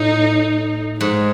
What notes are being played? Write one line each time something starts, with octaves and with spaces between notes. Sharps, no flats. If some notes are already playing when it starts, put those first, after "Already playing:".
Already playing: A2 D#4
G#2 G#3